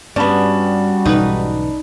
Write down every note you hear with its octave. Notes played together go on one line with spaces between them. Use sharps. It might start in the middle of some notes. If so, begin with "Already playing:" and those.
G2 G3 B3 C#4 F#4 D5 A5 B5
B1 G#2 E3 D#4 B4